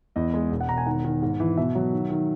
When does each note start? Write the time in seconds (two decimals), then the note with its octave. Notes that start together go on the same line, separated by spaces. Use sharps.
0.16 E2 D#5
0.34 G#3
0.52 E1
0.61 F#5
0.69 E1 A#5
0.78 G#5
0.86 D#3 F#5
1.04 D#3
1.22 G#2
1.40 E3
1.57 B2 E5
1.75 F#3
1.93 D#3
2.10 D#3